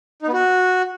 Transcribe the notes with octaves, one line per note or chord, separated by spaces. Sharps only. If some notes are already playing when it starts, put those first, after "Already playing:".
D#4
B3
F#4